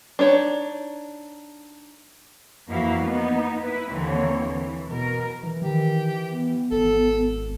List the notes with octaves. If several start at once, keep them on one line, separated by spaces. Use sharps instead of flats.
D4 D#4 C#5
F2 E3 A#3 E4 F#4 F5
A#3 B3 D#4
E4 B4
D#2 D3 E3 A#3 C4 C#5
E3
B2 A#4
E3
D#3 E3 G4
B3
G#1 A4